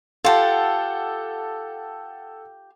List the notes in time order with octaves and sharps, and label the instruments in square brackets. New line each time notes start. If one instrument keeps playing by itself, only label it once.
[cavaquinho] F4 G4 [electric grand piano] A4 F#5 A5